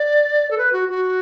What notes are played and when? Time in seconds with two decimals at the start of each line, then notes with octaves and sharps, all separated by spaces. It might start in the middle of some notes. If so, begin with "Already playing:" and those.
Already playing: D5
0.51 A4
0.58 B4
0.73 F#4
0.89 F#4